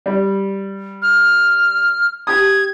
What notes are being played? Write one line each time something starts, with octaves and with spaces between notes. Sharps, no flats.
G3
F6
G4 D#6 G#6